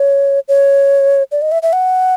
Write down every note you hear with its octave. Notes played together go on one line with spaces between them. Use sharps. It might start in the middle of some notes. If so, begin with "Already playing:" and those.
Already playing: C#5
C#5
D5
D#5
E5
E5
F#5